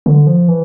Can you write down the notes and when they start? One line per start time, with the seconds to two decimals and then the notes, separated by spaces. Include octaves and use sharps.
0.06 D3
0.27 F3
0.48 E3